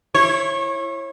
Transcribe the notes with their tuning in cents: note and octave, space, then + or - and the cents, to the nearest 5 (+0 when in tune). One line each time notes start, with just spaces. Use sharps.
E4 +15 C#5 -30